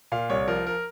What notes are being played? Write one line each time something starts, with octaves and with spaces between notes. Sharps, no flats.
A#2 F5
C2 C#5
F3 A#4
A#4